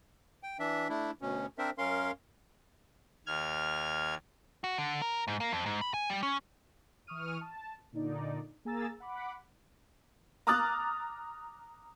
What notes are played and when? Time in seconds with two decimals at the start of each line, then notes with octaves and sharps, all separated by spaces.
0.43 G5
0.59 E3 D4 E5
0.89 A3 D4 E4
1.21 D2 B2 C#4
1.58 C4 D4 A#4 C5 E5
1.78 F#2 C#4 A#4 F5 C6
3.26 D#2 F6 G#6
4.64 F#4
4.78 D3
5.02 A#4
5.28 G#2
5.40 A#3
5.53 F2
5.66 G#2
5.81 B5
5.94 G#5
6.10 G3
6.23 C#4
7.07 E3 C#6 D#6 F6 D#7
7.41 A5
7.93 A#2 D3 D#4 D5
8.65 A#3 G#4 G#5 A#5 E6 A6
9.00 F#5 B5 D6
10.47 A#5 D6 D#6 F6 F#6 A6